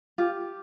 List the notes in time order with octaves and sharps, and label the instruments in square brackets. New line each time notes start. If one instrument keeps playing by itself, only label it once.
[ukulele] F4 [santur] G4